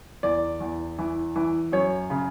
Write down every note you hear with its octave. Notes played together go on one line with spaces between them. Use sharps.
E2 D5
E2
E3
E3
F#2 C#5
C#3